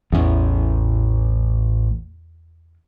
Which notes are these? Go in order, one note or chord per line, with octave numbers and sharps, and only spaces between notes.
A1 E2 C#4